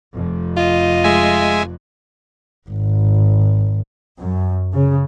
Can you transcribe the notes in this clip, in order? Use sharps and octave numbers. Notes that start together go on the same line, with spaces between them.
F1 F2
F4 D#5
G#3 E5 G#5
G#1
F#2
C#3